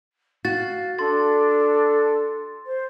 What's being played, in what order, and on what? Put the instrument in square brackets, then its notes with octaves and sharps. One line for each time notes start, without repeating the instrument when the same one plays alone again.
[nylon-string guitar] F#4 [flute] F5 [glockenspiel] A6
[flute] D4 [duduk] A4 [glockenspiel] C6 A6
[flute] C5